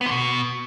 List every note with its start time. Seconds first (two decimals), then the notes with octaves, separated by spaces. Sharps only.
0.01 B3
0.06 D3
0.11 B2